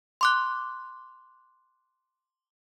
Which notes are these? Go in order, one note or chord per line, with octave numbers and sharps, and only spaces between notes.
C6 D6 F#6